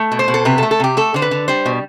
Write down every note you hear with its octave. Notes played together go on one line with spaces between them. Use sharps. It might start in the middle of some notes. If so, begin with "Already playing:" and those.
Already playing: A3
B2
C5
B2
A4
C3 B4
A4
A3
A4
C3 G4
A3 A4
D3 C5
B4
D3
G3 C5
B2